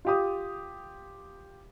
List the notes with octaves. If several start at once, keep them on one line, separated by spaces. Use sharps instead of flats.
F4 G4 D#6